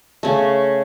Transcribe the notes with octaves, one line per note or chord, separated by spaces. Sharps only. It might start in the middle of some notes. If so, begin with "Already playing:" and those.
C#3 A3